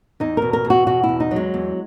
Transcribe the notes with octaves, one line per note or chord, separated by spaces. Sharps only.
E2 D#4
B2 A#4
A#4
E2
F#4
B2 F#4
E4
E2
D#4
F#3
G#3
E2